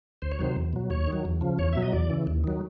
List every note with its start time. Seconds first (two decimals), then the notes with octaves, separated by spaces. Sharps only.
0.22 D2 C5
0.32 C#5
0.39 C3 D#3 F#3 C5
0.56 E2
0.73 B2 F#3
0.90 D#2 C#5
1.07 D#3
1.13 F#3
1.25 E2
1.41 C#3 F3
1.58 E2 C#5
1.73 B2 F#3 E5
1.82 D#5
1.93 E2 D5
2.10 C#3 E3
2.27 D#2
2.44 D#3 F#3